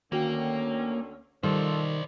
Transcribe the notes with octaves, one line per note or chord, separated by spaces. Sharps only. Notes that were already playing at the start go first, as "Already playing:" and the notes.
D2 D3 D#3 A#3 C#4 F#4 G5
D#3 F3 G3 A4 C5 D5